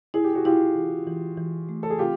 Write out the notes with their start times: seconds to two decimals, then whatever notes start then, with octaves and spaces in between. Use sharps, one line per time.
0.14 E4 G#4
0.24 G4
0.35 F#4
0.45 E4 F4 G4
0.75 E3
1.07 E3
1.38 E3
1.69 A3
1.83 A4
1.90 G#4
1.99 C4 F4 G4